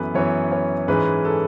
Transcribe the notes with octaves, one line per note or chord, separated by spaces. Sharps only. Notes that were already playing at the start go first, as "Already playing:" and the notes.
Already playing: F#2 E3 B3 A4 B4
F#2 E3 B3 C#5
C#5
G#2 E3 G#3 C#4 B4
A4